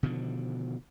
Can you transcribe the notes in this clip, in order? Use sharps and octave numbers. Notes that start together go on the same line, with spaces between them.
B2 D3 D#3 F3